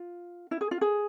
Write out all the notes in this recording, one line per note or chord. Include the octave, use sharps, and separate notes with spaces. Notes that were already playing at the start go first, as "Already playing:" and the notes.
Already playing: F4
E4
G#4
F4
G#4